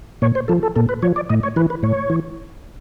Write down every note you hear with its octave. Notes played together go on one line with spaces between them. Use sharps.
A#2 C#5
C5
F3 A4
A4
A#2 A4
B4
F3 C#5
D5
A2 D#5
C#5
E3 B4
B4
A2 C#5
E3